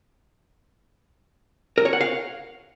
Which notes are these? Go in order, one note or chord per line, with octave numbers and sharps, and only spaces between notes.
A#4
C#5
F#5
F5